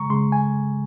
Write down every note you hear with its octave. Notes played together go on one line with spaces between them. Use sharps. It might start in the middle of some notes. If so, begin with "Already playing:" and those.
Already playing: C#3 G#3 A#5 C#6
C#3 G#3 C6
G#5